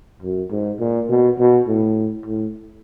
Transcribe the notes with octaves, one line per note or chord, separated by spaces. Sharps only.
F#2
G#2
A#2
B2
B2
A2
A2